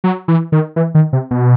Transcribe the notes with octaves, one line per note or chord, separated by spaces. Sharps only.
F#3
E3
D#3
E3
D#3
C3
B2